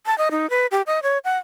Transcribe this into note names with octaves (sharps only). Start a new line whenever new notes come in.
A5
D#5
D#4
B4
G4
D#5
C#5
F#5